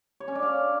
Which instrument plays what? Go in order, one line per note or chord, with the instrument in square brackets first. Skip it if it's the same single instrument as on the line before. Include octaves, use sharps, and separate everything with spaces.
[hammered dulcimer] C#5
C#4
D4
F5